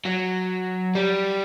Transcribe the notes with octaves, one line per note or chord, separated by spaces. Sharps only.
F#3
G3